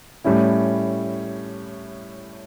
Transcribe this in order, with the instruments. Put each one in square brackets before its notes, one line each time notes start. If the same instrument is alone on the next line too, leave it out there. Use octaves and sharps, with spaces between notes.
[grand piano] A2 G3 C#4 E4